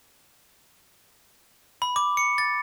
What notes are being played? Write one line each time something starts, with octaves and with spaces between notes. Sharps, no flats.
B5
D6
C#7
A6